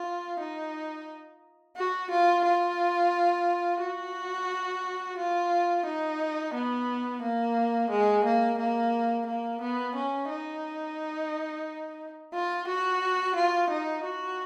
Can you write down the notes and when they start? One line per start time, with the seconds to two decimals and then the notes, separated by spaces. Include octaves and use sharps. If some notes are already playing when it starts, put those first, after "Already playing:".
Already playing: F4
0.40 D#4
1.77 F#4
2.11 F4
2.44 F4
3.81 F#4
5.18 F4
5.85 D#4
6.54 B3
7.22 A#3
7.90 G#3
8.25 A#3
8.58 A#3
9.26 A#3
9.61 B3
9.95 C#4
10.29 D#4
12.33 F4
12.67 F#4
13.36 F4
13.70 D#4
14.04 F#4